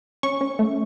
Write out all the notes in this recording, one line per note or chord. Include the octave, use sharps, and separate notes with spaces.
C#4 C#6
C#4
A3